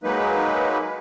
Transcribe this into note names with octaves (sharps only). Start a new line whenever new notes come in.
F#3 G#3 A#3 D#4 B4